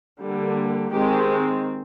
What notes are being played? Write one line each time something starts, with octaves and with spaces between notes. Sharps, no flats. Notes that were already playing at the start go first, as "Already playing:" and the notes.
D3 G3 A#3
D#3 G#3 C4 G4